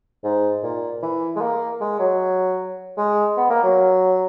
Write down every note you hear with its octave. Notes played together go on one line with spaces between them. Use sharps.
G#2
A#2
E3
G#3
A#3
G#3
F#3
G#3
B3
A#3
F#3